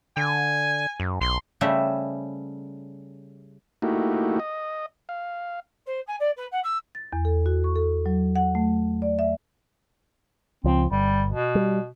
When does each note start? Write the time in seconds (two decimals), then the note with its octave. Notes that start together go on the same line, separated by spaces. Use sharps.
0.17 D3 G#5
1.00 F#2
1.21 B1 C6
1.61 C#3 G3 A3 C5 E5
3.82 A3 A#3 D#4 E4 F#4 G4
4.40 D#5
5.09 F5
5.86 C5
6.07 G#5
6.20 D5
6.36 B4
6.51 F#5
6.63 E6
6.95 A6
7.13 E2
7.25 A4
7.46 F#4
7.64 C#6
7.76 A4
8.06 F#3
8.36 F#5
8.55 A3
9.02 D5
9.19 E5
10.64 C#2 F3 C4
10.91 G1 G3
11.31 B2
11.55 G3